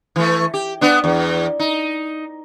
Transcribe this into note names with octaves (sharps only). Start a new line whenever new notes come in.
E3 A3
G4
B3 D4
E2
D#4